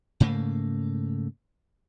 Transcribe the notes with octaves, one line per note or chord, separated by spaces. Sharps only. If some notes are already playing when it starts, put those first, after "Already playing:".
G#2 C#3 A3 A#3